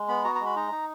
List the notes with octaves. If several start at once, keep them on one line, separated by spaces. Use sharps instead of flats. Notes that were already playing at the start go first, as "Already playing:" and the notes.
Already playing: G#3
B3 B5
F#4 A#5
A#5
G#3
B5
D#4 A#5
D#4